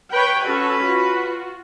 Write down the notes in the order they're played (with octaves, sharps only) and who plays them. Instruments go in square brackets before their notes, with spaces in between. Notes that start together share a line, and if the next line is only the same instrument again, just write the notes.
[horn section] B4 [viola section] C#5 G5
[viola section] C#4 F#4 A4
F4 F#4